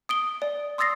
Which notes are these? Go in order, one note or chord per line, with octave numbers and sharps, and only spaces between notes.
D#6 D7 G7
D5
C6 D#6 E6 A6 A#6 C7